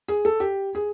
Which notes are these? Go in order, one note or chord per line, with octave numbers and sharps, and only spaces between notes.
G#4
A4
G4
G#4